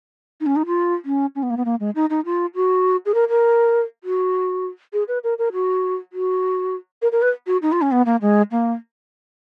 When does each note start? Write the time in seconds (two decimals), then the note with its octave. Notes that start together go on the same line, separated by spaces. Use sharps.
0.41 D#4
0.46 C#4
0.56 D#4
0.66 F4
1.05 C#4
1.35 C#4
1.43 B3
1.50 A#3
1.57 B3
1.65 A#3
1.80 G#3
1.95 D#4
2.10 D#4
2.25 F4
2.55 F#4
3.06 G#4
3.14 A#4
3.29 A#4
4.04 F#4
4.93 G#4
5.08 B4
5.24 A#4
5.38 A#4
5.53 F#4
6.13 F#4
7.02 A#4
7.12 A#4
7.22 B4
7.47 F#4
7.62 D#4
7.72 F4
7.82 C#4
7.92 B3
8.06 A#3
8.21 G#3
8.51 A#3